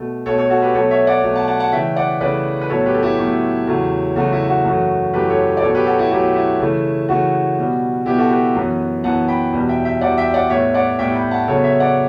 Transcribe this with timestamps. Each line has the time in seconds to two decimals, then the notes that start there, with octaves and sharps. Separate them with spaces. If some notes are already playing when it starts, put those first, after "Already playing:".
Already playing: B2 A3
0.26 B2 A3 A4 C#5
0.38 A4 C#5
0.50 F#4 A4
0.62 G4 B4
0.74 B2 F#3 A3 A4 C#5
0.91 C#5 E5
1.07 D5 F#5
1.23 B2 F#3 A3
1.35 F#5 A5
1.48 F#5 A5
1.60 F#5 A5
1.72 C#3 E3 A3 E5 G5
1.96 D5 F#5
2.21 C#3 E3 A3 B4 D5
2.61 B4
2.69 A2 F#3 B3 A4 C#5
2.86 G4 B4
2.94 A4
3.02 E4 G4
3.19 A2 F#3 B3
3.67 E2 C#3 F#3 A3
4.16 E2 C#3 F#3 A3 F#4
4.32 E4
4.49 F#4
4.65 F#2 E3 A3
5.14 F#2 E3 A3 G4 B4
5.30 A4 C#5
5.57 D5
5.62 B2 F#3 A3 A4 C#5
5.75 G4 B4
5.87 F#4 A4
5.99 E4 G4
6.11 B2 F#3 A3 E4 G4
6.35 E4
6.60 C#3 E3 A3
7.09 C#3 E3 A3 F#4
7.58 B2 G3 B3
8.06 B2 G3 B3 E4 G4
8.18 F#4 A4
8.31 G4 B4
8.55 F#2 E3 B3
9.04 F#2 E3 B3 F#5 A5
9.28 G5 B5
9.52 E2 B2 G3
9.69 E5 G5
9.85 E5 G5
10.01 E2 B2 G3 D5 F#5
10.18 E5 G5
10.34 D5 F#5
10.50 A2 G3 B3 C#5 E5
10.74 D5 F#5
10.99 A2 G3 B3 E5 G5
11.15 G5 B5
11.31 F#5 A5
11.47 C#3 F#3 B3 A4 C#5
11.64 C#5 E5
11.80 D5 F#5